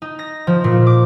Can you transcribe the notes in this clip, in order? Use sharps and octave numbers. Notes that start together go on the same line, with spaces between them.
D#4
A#6
F3
A#2
D6